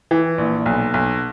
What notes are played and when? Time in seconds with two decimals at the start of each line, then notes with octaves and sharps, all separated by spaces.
0.11 E3
0.38 A#1
0.66 B1
0.94 B1